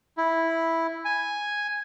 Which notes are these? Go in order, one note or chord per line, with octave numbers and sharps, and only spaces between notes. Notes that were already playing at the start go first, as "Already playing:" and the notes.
E4
G#5